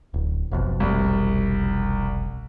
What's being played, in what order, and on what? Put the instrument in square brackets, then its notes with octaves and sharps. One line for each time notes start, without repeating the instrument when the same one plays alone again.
[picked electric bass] D1
F1 B1 F2
[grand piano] C2